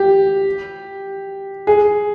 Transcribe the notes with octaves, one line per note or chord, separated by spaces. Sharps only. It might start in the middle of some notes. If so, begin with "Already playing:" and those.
Already playing: G4
G#4